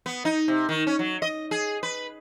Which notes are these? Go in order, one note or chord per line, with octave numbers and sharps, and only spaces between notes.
B3
D#4
C3
D#3
C#4
F#3
D#5
G#4
B4